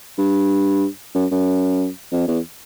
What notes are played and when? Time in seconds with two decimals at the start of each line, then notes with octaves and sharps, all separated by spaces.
0.18 G2
1.15 F#2
1.31 F#2
2.12 F2
2.28 E2